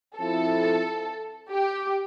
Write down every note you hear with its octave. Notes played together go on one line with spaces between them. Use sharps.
F3 C4 E4 A4
G4